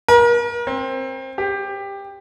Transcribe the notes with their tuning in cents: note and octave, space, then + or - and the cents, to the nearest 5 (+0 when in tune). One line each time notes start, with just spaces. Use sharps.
A#4 +35
C4 +20
G4 +15